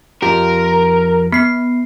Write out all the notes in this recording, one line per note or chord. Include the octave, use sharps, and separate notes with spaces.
F2 F4 G4 A#4
B3 B5 C7